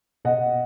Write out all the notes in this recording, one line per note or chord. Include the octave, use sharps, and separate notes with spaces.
B2 D#5 F#5